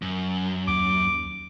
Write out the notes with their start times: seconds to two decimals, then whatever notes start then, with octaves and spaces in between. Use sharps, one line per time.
0.02 F#2
0.68 D#2 D6